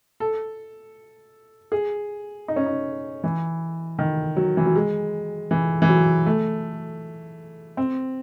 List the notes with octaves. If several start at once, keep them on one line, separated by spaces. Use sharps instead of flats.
A4
G#4
D#4
C#4
D#4
E3
D#3
F#3
E3
F#3
G#3
E3
E3
F#3
A3
C4